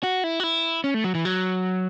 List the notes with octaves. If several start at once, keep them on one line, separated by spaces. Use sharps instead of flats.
F#4
E4
F#4
E4
C#4
A3
F#3
E3
F#3